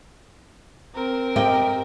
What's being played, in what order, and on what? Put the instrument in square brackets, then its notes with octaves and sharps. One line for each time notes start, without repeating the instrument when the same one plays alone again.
[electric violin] C4 A#4
[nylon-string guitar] G4 D#5 G5